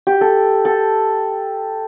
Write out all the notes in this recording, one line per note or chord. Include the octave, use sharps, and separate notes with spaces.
G4
A4
A4